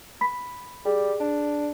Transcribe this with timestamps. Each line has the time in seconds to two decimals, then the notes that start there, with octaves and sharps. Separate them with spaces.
0.21 B5 B6
0.85 G3 G#4
1.20 D4